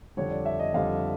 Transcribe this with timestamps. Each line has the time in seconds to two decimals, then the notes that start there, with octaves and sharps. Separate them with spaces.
0.17 F2 D3 G3 C#5
0.31 D5
0.45 E5
0.59 D#5
0.74 F2 D3 G3 F5